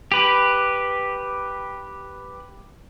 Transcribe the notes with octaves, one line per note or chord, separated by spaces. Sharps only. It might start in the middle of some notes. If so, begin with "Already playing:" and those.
G4 B4